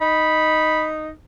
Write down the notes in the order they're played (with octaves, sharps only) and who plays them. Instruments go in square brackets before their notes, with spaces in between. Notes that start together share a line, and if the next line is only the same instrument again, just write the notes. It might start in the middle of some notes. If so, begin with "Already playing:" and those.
[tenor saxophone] D#4 [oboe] B5